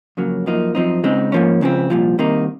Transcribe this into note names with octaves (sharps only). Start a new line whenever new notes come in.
F2 C#3 F#3 A#3
F#2 F3 A#3 D#4
F#2 F3 C4 D#4
C#2 C#3 G#3 C4 D#4
G#2 F3 A#3 C#4
C#2 C#3 F3 C4
C2 A#2 F3
C2 C3 D#3 A#3 D#4